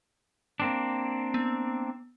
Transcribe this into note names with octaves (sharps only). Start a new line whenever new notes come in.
A#3 C4 D4
B3